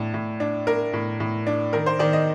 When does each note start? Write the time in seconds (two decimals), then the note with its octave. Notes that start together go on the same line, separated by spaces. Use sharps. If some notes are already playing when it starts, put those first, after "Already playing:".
Already playing: A2 D4
0.14 A2
0.40 D4
0.67 D4 A#4
0.93 A2
1.20 A2
1.47 D4
1.73 D#3 A#4
1.86 C5
1.99 D#3 D5
2.13 D#5